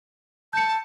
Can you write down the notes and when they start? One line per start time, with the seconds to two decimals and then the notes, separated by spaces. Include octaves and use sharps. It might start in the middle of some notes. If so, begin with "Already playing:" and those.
0.53 A5 G6 C#7